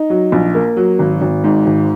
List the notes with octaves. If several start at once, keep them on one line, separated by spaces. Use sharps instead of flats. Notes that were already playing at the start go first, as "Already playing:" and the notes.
Already playing: D#4
F#3
A#1
A#3
F#3
G#1
G#1
G#2
G#1